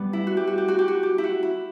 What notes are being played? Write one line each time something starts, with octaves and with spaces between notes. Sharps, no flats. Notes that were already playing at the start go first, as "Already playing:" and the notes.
Already playing: G3 B3
E4
F#4
G4
F#4
G4
F#4
G4
F#4
G4
E4
F#4
E4